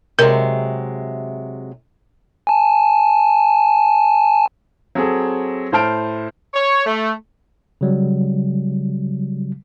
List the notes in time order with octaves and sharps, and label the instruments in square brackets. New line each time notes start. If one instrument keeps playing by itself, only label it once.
[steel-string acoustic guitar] C3 F#3 G#3 [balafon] A#4
[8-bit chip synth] G#5 A5
[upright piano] F#3 C4 G#4 A4
A2 C5 A5 F6 D7
[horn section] C#5
A3
[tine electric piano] C#3 F#3 G3